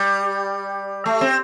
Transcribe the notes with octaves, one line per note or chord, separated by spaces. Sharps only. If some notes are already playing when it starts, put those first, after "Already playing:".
Already playing: G3
A3
C4